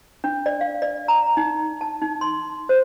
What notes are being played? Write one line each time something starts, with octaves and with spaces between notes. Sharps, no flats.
D4
D5
F5
D5
A#5
D#4
A5
D#4
C6
C5